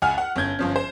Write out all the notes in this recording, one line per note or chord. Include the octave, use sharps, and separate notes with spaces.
C#2 F#5 G#5 F6
F#5
G1 C#4 G6 G#6
G1 F3 C#4
C5